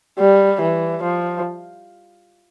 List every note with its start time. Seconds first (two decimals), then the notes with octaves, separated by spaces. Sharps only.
0.19 G3
0.61 E3
1.03 F3